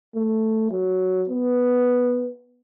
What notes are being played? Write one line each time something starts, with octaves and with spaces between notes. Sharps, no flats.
A3
F#3
B3